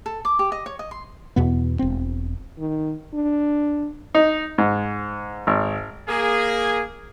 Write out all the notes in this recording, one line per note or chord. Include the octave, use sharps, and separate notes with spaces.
A4
D6
G4
D#5
C#5
D#5
C6
E2 B2 B3
E1 C4
D#3
D4
D#4
G#2
G#1
A#3 G#4